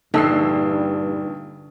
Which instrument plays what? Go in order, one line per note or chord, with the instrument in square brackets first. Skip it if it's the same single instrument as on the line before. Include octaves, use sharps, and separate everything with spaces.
[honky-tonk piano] A#1 E6 C7 [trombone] G2 [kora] D3 [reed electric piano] D#4